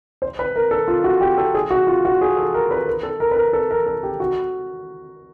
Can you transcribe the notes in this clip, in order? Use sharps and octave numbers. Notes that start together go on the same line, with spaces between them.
C5
B4
A#4
A4
F4
F#4
G4
A4
G#4
F#4
F4
F#4
G#4
A4
A#4
B4
A#4
A4
A#4
B4
A#4
A4
A#4
A4
G4
F#4